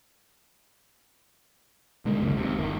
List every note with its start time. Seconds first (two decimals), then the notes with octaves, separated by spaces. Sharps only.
2.05 B2 D3 G#3 A#3
2.19 F#1 C#2 F#2
2.36 D#2 C3
2.58 G1 D#3